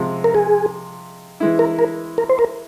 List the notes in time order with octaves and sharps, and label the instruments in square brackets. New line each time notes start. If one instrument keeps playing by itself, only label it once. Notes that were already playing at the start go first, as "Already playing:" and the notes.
Already playing: [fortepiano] C3 F3 G#3
[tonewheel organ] A#4
G#4
[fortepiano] E3 G#3 E4
[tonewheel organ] A#4
A#4
A#4
C5
A#4